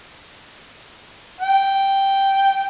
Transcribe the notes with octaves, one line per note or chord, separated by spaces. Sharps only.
G5